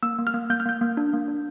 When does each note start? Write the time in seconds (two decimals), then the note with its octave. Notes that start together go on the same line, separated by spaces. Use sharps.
0.03 A#3 E6
0.19 A#3
0.27 F6
0.34 A#3
0.50 A#3 G6
0.60 F6
0.66 A#3 G6
0.81 A#3
0.97 D4
1.13 A#3
1.28 D4